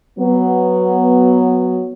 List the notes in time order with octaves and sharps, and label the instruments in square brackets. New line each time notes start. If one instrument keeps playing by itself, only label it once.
[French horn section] F#3 B3